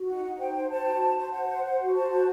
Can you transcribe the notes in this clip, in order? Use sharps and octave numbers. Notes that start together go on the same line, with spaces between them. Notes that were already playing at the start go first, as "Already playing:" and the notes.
Already playing: F#4
D#4 F#5
D#4
C5 G5
C5
C5 A5
F#4
C5
C5
C5 F#5
C5
C5
F#4
C5 A5
F#4